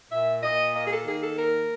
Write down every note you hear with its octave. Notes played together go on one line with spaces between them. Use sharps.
A#2 E5
A#2 D#5
A#3 D#5
G#4
A4
D#3 G#4
A4
A#3 A#4